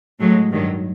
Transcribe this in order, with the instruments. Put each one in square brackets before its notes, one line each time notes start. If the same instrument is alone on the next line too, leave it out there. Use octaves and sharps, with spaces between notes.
[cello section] A2 F#3 G#3
G2 D#3 F#3